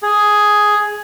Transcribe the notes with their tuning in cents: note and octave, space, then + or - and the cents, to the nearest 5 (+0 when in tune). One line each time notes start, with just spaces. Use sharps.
G#4 +5